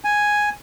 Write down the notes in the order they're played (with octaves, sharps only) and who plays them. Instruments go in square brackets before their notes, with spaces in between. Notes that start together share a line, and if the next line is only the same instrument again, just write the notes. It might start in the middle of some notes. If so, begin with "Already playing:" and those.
[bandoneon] G#5